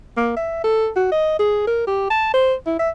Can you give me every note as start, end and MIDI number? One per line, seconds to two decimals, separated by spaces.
0.17 0.33 58
0.37 0.60 76
0.64 0.88 69
0.96 1.10 66
1.12 1.38 75
1.39 1.63 68
1.67 1.85 70
1.87 2.06 67
2.10 2.31 81
2.34 2.54 72
2.66 2.79 64
2.79 2.90 76